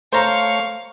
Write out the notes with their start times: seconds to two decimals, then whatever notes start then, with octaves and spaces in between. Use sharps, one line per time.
0.12 A3 C5 C#5 F5 A#5 C#6